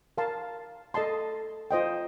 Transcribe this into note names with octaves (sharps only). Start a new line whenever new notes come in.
A#4 F5 A5 C6
A4 D#5 A5 C6
F4 C5 D#5 G5